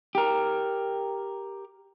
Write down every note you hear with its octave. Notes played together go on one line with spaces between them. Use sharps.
G4 A#4